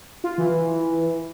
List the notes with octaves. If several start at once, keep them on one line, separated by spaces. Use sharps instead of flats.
F4
E3